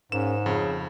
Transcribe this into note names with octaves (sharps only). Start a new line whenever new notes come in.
G#2 C#3 A#3 C#4 E7
F2 C#3